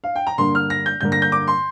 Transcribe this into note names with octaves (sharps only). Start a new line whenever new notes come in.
F5
G5
A#5
G2 D3 A#3 C6
F6
A#6
G6
G2 D3 A#3 G6
A#6
G6
D6
C6